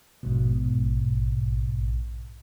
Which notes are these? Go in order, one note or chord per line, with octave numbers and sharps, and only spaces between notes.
A#1 G#2 B2